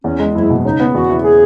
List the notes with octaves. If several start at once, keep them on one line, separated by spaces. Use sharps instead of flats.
E2 C#4
G#3
F#1 E4
B2
C#3 D#4
B3
E2 F#4
E3
G#4